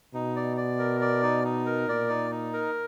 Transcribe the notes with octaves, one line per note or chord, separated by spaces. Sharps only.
B2 D#4
D5
D5
A#4
D5
D#4
D#4
A#4
A#2 D5
D#4
D#4
A#4